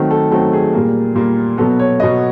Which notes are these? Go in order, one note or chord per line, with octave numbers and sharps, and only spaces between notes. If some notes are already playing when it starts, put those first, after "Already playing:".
Already playing: D#3 F#3 A3 C4
A4
D#3 F#3 A3 C4 A4
G#4
A#2 G3 A#3
A#2 G3 A#3
B2 F#3 B3 A4
C#5
B2 F#3 B3 D#5